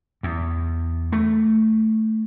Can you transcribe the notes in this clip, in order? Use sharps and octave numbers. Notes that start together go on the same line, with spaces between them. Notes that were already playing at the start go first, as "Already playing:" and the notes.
E2
A3